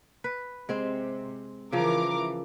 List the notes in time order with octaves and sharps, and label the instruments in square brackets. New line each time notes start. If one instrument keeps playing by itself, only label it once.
[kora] B4
[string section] C3 [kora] G#3 C4
[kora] C#3 F3 [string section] E3 A#4 D6